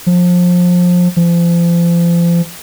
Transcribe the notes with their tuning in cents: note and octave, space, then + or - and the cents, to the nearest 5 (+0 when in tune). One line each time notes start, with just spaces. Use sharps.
F3 +25
F3 -35